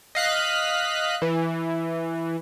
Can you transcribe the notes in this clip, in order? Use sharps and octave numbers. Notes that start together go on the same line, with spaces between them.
D#5 F5 F#6 B6
E3